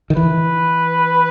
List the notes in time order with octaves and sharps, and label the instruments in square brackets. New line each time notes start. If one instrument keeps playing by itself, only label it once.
[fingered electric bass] D#3
[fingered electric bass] E3 [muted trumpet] B4